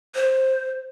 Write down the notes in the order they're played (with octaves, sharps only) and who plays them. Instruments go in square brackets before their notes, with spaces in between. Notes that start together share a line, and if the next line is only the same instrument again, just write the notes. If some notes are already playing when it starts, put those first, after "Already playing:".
[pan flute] C5